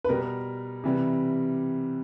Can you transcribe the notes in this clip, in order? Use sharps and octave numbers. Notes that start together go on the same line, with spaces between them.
B4
B2 G3 A#4
C3 E3 G3